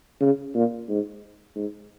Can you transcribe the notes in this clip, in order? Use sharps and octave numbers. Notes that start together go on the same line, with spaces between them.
C#3
A#2
G#2
G#2